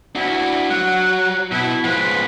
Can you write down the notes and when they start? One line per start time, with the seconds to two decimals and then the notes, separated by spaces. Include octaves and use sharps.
0.15 D4 E4 F#4
0.71 F#3 F#5
1.52 B2 E4
1.85 F3 G#3 B4